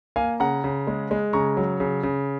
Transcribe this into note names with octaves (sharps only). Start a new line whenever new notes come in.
A#3 F5 G#5
C#3 F#5 A#5
C#3
G#3
G#3
C#3 A#5 C#6
F#3
C#3
C#3